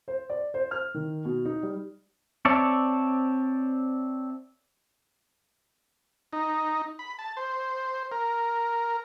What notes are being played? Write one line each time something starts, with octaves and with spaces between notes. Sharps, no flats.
C5
D5
C5
F6
D#3
B2
D#4
G3
C4 C#5 D5 E5 A5
D#4
B5
A5
C5
A#4